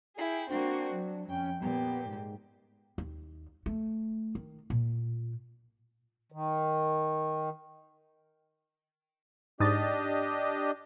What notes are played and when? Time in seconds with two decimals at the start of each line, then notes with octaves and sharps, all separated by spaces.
0.18 E4 G#4 G5
0.50 A#3 C4 D4 F#4
0.93 F#3
1.29 F2 C#4 G5
1.62 A#2 B3 G4
2.05 G#2
2.98 D#2
3.66 A3
4.35 D#3
4.70 A#2
6.32 D#3
9.60 G#2 D4 G4 D#5 D#6 A6